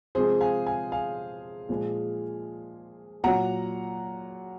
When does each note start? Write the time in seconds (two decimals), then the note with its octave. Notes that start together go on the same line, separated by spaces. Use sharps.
0.15 C3 F3 G#3 G#4 C5
0.41 F5 G#5
0.66 F5 G#5
0.92 F5 G#5
1.69 A#2 F3 G#3
3.24 A#2 F#3 F#5 A#5